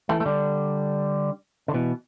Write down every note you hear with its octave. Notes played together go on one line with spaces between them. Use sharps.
E3 A3
A3
D3 G3
D3
B2 E3